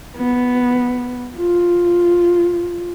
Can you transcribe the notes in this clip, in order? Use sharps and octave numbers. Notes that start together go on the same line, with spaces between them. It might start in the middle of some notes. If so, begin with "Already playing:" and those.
B3
F4